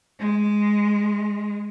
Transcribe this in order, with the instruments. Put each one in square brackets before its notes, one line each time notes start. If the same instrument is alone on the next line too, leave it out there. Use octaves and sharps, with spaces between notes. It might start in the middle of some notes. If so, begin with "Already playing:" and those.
[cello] G#3